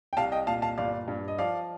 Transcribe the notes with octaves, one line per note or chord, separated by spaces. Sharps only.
G5
C2 F5 A5
D#5 G5
A#2 F5 A5
F5 A5
G1 D5 F5
G2
D#5
F3 D5 F5